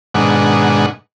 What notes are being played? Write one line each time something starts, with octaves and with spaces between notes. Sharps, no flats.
G#2 B2 D#3 G#3 D4 F#5